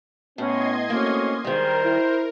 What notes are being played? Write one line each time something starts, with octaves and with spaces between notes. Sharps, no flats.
A2 B3 C#4 D#5 C6 G#6
A3 A#3 C4 C#4 F#4
D#3 G3 G#3 A#4 C5
E4